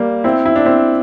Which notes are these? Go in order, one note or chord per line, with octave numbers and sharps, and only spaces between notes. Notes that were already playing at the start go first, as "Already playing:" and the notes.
Already playing: G3 A#3
C4 E4
E4
D4
C4 E4